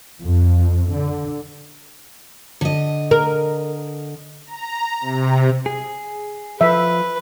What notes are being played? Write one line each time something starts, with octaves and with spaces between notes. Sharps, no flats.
F2
D3
D3 D#5
A#4
A#5
C3
G#4
F3 B4 E5